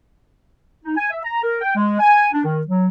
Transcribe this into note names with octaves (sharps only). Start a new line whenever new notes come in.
D#4
G#5
E5
A#5
A#4
G5
G#3
G#5
D4
D#3
F#3